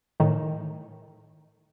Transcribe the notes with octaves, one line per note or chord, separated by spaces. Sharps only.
A2 D#3